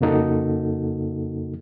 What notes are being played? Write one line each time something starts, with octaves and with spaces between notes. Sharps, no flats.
F2 C#3 A#3 D#4 F#4 A4